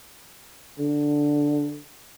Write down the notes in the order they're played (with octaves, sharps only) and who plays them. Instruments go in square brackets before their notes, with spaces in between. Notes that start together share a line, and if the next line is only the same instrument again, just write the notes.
[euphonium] D3